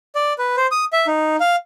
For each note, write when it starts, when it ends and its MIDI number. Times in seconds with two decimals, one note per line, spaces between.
0.15 0.33 74
0.38 0.56 71
0.57 0.66 72
0.71 0.85 87
0.93 1.06 76
1.07 1.36 63
1.40 1.56 77